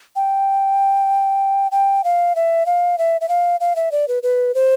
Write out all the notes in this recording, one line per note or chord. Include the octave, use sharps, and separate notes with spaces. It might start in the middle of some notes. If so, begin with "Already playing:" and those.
G5
G5
F5
E5
F5
E5
E5
F5
F5
E5
D5
B4
B4
C5